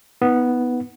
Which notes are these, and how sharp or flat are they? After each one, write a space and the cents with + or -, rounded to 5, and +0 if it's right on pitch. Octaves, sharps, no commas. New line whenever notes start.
B3 +0 D#4 +25